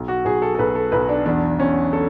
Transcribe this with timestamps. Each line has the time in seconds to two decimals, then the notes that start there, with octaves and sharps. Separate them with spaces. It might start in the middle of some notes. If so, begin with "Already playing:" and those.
Already playing: B1
0.08 F#4
0.25 B1 G#4
0.42 A4
0.55 A4
0.59 B1 B4
0.75 A4
0.92 B1 B4
1.09 D4
1.26 E2 D4
1.59 E2 C#4
1.93 A4